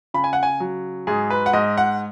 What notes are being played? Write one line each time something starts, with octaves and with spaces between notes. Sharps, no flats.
C#3 B5
G#5
F#5
G#5
F#3
G#2 G#4
B4
F#5
G#2 D#5
F#5